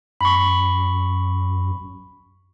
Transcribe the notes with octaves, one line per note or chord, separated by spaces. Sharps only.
F#2 B5 C#6